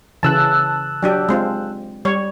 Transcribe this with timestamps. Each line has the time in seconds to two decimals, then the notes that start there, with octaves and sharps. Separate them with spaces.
0.23 C#3 E3 A5 E6 F#6
1.03 F#3 D4 G4
1.29 G#3 C4 F4
2.05 G3 C#5